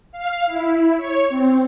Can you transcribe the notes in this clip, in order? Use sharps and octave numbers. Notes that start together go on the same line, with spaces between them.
F5
E4
C#5
C4